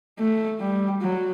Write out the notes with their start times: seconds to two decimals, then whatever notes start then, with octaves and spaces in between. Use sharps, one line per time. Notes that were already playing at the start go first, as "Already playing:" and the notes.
0.19 A3
0.60 G3
1.02 F#3